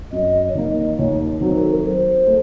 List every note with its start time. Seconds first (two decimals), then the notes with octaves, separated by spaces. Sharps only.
0.12 F#2 D#5
0.48 C#5
0.55 D#3 A#3 D#5
0.98 D#2 C#5
1.41 D#3 F#3 C4
1.56 A#4
1.63 A4
1.70 A#4
1.84 F#3 C5
2.27 A3